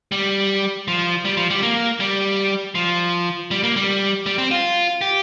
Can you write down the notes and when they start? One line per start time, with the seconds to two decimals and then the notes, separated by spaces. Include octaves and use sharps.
0.12 G3
0.88 F3
1.25 G3
1.37 F3
1.50 G3
1.63 A#3
2.00 G3
2.75 F3
3.51 G3
3.63 A#3
3.76 G3
4.26 G3
4.38 C4
4.51 F4
5.01 G4